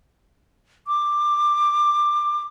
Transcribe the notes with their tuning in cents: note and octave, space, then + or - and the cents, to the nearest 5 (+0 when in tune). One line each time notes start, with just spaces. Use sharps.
D6 +15